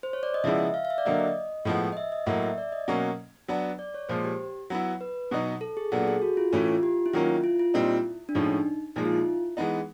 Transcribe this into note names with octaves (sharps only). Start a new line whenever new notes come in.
C5
C#5
D5
D#5
C#3 F3 G#3 B3 E4 E5
E5
F5
F5
E5
D5
D3 F#3 A#3 D4 D#5
D#5
A2 F3 G#3 B3
D#5
E5
D#5
A2 F#3 A#3 E5
E5
D5
D#5
B2 F#3 A#3 C#4
F#3 B3 D4
D5
C#5
A#2 F3 G#3 C5
G4
F#3 B3 E4
B4
B2 F#3 B3 D#4
A4
G#4
A#2 F#3 B3 D4 A4
G#4
F#4
F4
A2 E3 A3 C#4 E4
F4
G4
E4
D#3 F#3 A#3 C#4 F4
E4
F4
F4
A#2 G3 C4 D#4 E4
D4
A2 F3 G#3 C#4 D#4
A#2 F3 G#3 D#4
F4
E4
E3 G#3 B3 D#4